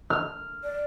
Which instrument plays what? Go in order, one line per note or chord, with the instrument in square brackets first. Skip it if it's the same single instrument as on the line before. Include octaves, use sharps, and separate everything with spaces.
[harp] F6
[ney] D5